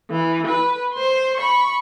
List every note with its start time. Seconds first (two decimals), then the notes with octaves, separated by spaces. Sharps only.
0.11 E3
0.47 B4
0.94 C5 C6
1.37 B5 C#6